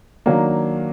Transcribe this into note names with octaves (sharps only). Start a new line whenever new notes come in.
D#3 F#3 A#3 D4